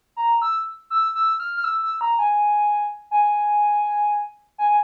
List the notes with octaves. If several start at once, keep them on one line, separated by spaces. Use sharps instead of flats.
A#5
E6
E6
E6
F6
F6
E6
E6
A#5
G#5
G#5
G#5
G#5